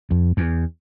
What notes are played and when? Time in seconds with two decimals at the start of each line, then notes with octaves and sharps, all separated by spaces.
0.11 F2
0.37 E2